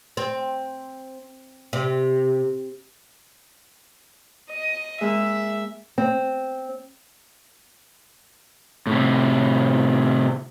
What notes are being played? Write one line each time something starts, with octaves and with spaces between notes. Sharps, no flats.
C4
C3
D#5
G#3 A#3 E5
C4
A2 C3